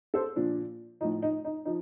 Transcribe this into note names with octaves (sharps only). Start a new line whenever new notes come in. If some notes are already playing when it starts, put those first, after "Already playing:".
A4 C5
A#2 F3 D4
A2 F3 D#4
D#4
D#4
F3 D#4